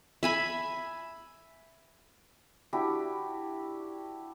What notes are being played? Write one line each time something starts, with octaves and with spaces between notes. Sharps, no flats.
E5 G#5 B5
D4 E4 F#4 G4